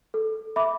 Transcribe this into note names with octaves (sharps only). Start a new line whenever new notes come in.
A4
E5 B5 D6